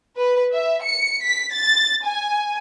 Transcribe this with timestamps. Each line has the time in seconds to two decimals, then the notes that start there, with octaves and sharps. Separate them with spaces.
0.17 B4
0.53 E5
0.83 C#7
1.23 B6
1.53 A6
2.05 G#5